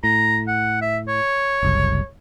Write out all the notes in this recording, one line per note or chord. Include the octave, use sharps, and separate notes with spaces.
A2 A#5
F#5
E5
C#5
F#1 C2